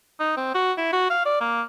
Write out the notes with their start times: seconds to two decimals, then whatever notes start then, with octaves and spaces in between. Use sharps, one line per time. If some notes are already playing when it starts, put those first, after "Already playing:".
0.20 D#4
0.37 C4
0.54 F#4
0.78 E4
0.93 F#4
1.10 F5
1.25 D5
1.41 A#3